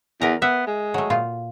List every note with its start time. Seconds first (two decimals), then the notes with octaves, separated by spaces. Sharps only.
0.21 E2 A#4 A#5
0.42 B3 E5
0.67 G#3
0.94 F#3 A3
1.10 A#2 F4